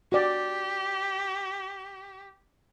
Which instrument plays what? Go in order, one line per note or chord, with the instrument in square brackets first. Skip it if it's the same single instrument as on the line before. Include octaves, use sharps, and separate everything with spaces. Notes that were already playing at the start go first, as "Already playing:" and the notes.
[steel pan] F#4 D5 [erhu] G4